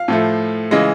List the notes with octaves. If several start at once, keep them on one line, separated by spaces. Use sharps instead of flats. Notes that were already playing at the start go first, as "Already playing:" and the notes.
Already playing: F5
A2 F3 A3
C#3 E3 G#3 D#5